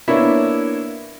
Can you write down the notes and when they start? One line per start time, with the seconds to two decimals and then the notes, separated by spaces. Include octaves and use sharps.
0.08 A#3 B3 D4 E4 C#5 E5